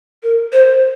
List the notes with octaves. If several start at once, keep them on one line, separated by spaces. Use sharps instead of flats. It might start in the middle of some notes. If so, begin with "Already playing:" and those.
A#4
C5